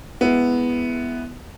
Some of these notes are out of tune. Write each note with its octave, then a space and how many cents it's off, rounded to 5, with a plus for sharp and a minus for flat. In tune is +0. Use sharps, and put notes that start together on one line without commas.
G#3 +0 B3 +0 E4 +0